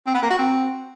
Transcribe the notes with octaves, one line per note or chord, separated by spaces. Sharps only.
C4
B3
A#3
F#4
C4